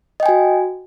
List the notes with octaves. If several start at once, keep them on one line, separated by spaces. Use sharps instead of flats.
F#4 D#5 G5 G#5